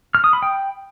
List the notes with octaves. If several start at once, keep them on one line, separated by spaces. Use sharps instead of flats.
F6
D#6
B5
G5